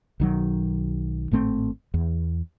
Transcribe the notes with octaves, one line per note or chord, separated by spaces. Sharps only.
B1 D#3 F#3
G#1 A2 A3 C4
E2